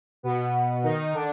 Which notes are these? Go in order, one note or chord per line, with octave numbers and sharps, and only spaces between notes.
B2 B3
D#3 D#4
D3 D4